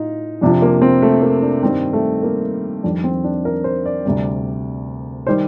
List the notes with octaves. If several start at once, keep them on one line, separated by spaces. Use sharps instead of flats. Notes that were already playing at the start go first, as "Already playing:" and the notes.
Already playing: A2 D#4 F4
F2 C3 F3 D4
A#3
C4
A3
A#3
D4
G2 D#3 G3 C4
A3
A#3
F2 D#3 G3 D4
C4
D4
A#4
C5
D5
D2 C3 G3
D#3 G3 C5